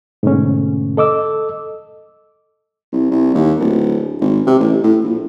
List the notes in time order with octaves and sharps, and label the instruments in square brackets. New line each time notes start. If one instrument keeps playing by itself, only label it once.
[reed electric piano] G#2 B2 D3 A3 C#4
A4 D#5 D6 E6
[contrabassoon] C2
C2
D#2
D1
G#1
C3
A1
A2
A#1